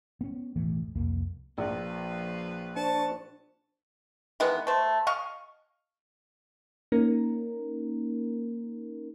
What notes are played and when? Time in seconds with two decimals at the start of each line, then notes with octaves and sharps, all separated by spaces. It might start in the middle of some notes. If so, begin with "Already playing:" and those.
0.21 B3 C#4
0.56 E1 A1 E3 A3
0.95 C2 F2 A#3
1.58 A#1 F3 B4
2.76 D4 C5 A5 C#6
4.40 D#3 E3 G#3 B3
4.67 A3 C5
5.07 D#5 F5 C#6
6.92 A#3 C#4 D#4 A#4